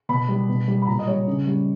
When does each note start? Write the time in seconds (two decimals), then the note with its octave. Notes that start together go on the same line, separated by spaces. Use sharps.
0.09 B2 B5
0.29 G3
0.49 B2
0.68 G3
0.82 B5
0.87 A#2 A#5
0.99 D#5
1.07 G3 C#5
1.27 C#3
1.47 G3